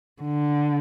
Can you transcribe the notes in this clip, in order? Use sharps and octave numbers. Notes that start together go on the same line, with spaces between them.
D3